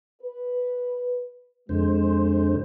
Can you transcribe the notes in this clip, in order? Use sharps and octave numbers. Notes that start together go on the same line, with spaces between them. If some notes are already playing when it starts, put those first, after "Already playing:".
B4
F2 D3 G#3 C5